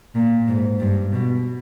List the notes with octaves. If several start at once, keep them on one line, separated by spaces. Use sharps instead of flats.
A#2
G#2
G2
B2